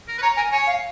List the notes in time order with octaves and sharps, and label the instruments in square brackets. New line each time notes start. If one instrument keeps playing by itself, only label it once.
[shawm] A#4
B4
[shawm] C#5 [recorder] A#5
[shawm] A#4 [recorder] G#5
[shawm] C#5 [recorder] G#5
[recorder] F5